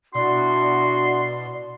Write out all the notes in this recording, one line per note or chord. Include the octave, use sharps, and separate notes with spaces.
B2 D4 E4 F#4 D5 C6